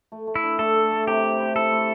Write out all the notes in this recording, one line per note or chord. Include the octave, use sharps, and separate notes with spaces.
A3
A3
E4
D4
A3 A4
A3
A3
C3 G4
E4
E4
E4 A4
A3